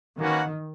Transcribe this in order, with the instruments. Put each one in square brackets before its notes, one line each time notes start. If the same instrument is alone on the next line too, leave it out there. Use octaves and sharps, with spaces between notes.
[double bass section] D#3 [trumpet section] A#3 C#4 F#4 B4 F#5